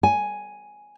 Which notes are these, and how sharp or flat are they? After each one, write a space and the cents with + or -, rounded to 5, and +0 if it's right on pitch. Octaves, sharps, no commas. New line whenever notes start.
G#5 +5